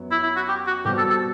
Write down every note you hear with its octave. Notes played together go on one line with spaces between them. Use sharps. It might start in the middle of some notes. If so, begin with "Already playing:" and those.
Already playing: F#2 F#3 B3
E4
E4
F#4
G4
F#4
B2 G3 C4 G4
A4
A4